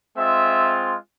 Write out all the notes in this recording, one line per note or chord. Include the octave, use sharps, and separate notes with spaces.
G#3 C4 F4 E5